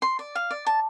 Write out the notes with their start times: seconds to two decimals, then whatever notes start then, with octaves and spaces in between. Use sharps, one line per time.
0.02 C6
0.19 D5
0.35 F5
0.51 D5
0.66 A5